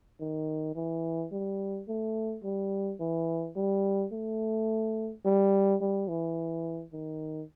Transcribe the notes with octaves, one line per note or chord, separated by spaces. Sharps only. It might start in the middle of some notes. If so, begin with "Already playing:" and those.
D#3
E3
G3
A3
G3
E3
G3
A3
G3
G3
E3
D#3